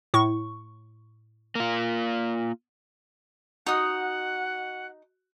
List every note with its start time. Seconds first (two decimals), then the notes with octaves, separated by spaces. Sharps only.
0.14 A2 C#6
1.55 A#3 F4
3.66 D#4 F#4 D#5 F#5 D#6